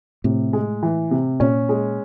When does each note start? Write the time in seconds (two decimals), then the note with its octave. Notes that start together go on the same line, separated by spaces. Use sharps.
0.24 A2 C3
0.53 G#3
0.83 E3
1.11 C3
1.40 A#2 C#4
1.69 G#3